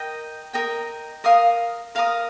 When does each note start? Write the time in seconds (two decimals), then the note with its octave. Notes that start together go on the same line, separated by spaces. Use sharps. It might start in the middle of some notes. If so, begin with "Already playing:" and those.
Already playing: A#4 D#5 G5 A#5
0.53 A#4 D#5 G5 A#5
1.24 A#4 F5 A#5 D#6
1.95 A#4 F5 A#5 D#6